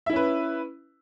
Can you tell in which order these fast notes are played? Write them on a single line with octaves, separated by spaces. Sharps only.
E5 E4 C#4 B4